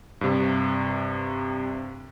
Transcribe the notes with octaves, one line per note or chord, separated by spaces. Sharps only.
G2 C3